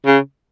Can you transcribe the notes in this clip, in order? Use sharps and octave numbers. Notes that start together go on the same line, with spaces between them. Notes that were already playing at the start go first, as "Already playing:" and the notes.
C#3